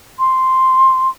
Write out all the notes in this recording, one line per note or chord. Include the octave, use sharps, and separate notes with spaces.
C6